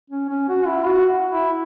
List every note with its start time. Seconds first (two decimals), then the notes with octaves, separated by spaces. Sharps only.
0.10 C#4
0.29 C#4
0.49 F#4
0.67 E4
0.86 F#4
1.31 E4